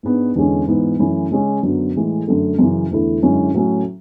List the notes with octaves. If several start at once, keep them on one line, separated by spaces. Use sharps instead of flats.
G#2 G#3 B3 D4
E2 D3 G#3 C#4
G#2 E3 B3
F#2 E3 A3 C#4 E4
C#3 G#3 C#4
F#2 D3 F#3 B3
A2 E3 G#3
F#2 D3 A3
F#2 C#3 E3
E2 D3 A3 E4
F#2 D3 G#3 C#4 E4
A2 F#3 C#4 E4